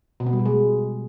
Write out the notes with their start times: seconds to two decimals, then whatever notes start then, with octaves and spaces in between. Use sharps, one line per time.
0.20 B2
0.26 B3
0.33 G3
0.39 B2
0.46 G#3